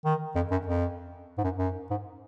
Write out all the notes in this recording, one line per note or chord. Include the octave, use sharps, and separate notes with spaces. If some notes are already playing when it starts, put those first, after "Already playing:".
D#3
F2
F#2
F2
G#2
F#2
F#2
G#2